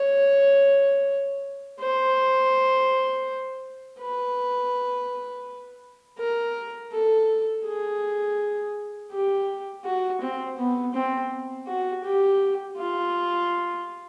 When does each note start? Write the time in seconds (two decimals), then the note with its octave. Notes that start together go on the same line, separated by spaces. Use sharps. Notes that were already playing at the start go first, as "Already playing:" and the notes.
Already playing: C#5
1.80 C5
4.00 B4
6.19 A#4
6.92 A4
7.65 G#4
9.12 G4
9.85 F#4
10.21 C4
10.58 B3
10.94 C4
11.67 F#4
12.04 G4
12.77 F4